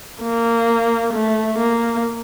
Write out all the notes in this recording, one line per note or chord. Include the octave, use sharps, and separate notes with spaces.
A#3
A3
A#3